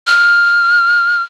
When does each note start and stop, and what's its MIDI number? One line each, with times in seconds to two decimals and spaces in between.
0.07 1.23 89